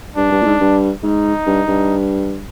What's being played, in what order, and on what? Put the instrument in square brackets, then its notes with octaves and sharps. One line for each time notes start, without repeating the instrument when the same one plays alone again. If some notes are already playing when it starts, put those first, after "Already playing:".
[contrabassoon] G2 [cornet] D4
[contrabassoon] G2
A#2
G#2
G2
[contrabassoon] G#2 [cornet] D#4
[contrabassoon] G2
G2